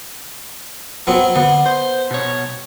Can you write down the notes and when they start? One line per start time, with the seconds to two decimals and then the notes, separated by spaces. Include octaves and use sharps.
1.07 F#3 B3 C4
1.36 D3 B3
1.66 C5
2.11 B2 C#5